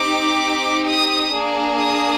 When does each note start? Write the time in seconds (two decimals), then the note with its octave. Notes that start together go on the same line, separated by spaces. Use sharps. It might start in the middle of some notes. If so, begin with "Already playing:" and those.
Already playing: C4 D#4 G4 D6
0.86 D#6
1.34 A#3 D4 G#4
1.81 D#6